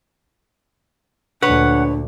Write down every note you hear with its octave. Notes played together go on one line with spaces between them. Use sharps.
D2 A#2 D4 B4 C#5 F#5